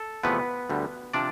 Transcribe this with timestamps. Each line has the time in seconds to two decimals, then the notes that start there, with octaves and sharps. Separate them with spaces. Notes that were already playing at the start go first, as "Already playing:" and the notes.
Already playing: A4
0.23 E2 C3 F3 A3 B3 B4
0.70 D2 D3 G3
1.14 C3 F3 D4 D5